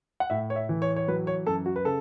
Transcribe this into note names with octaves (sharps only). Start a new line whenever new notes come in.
F#5
A2 E5
C#5
E5
E3
C#5
C#5
F#3 B4
C#5
F#2 A4
F#4
B4
C#3 A4